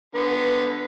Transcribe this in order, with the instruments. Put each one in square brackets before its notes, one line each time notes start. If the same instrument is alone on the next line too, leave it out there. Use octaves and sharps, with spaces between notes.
[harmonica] D3 B3 B4